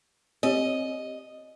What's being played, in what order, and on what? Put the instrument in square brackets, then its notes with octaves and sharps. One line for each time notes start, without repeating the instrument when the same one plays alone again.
[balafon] C4 G4 C#5 [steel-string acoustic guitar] D#5